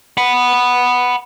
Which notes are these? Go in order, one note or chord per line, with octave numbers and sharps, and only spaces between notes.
F#5 B5